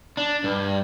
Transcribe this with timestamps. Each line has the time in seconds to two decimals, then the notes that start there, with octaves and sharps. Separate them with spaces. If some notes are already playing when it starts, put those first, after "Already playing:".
0.17 D4
0.44 G2